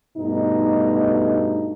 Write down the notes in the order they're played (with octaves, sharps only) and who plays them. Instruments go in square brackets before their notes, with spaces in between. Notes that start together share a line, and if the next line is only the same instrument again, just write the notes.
[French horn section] G2 B2 A3 D#4